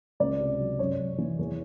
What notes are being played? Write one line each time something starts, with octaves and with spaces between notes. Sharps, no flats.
C#2 D5
C3
F#3
F#2 C#5
F#2
E3
E2